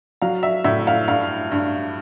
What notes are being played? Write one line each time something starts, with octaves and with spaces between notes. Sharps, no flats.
F#3 F5
E5
A2 E5
F5
G2 F5
G2